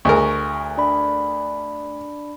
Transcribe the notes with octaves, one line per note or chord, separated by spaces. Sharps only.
D2 G#4 A#4 C#6
D4 D5 B5